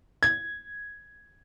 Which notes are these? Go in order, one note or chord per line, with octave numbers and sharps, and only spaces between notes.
G#6